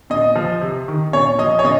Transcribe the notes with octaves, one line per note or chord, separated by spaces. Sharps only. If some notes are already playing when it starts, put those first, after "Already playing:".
A#2 D#5
F3
C3
D#3
A#2 C#5
F3 D#5
C#5
A#2 D#5